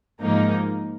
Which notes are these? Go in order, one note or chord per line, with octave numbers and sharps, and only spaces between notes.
G#2 F3 A#3 D#4